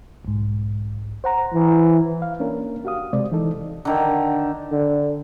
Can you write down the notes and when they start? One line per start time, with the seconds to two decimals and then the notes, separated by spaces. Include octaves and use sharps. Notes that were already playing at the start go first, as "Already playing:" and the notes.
0.25 B1 G#2
1.24 C5 F#5 A#5
1.54 E3
2.22 F5
2.40 A#3 C#4 D4 A#4
2.85 F#4 G4 F5 D#6
3.13 C3 G#3 C5 D5
3.32 E3 D#4 A4
3.85 D3 D#3
4.72 D3